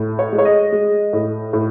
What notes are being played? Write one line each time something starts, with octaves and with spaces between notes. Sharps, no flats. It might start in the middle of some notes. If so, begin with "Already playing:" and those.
Already playing: A2
C#5
G#3
C#5
D#5
G#3
A2
A2